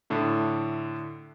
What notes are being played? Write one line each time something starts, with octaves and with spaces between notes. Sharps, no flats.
A2 D3 D4 E4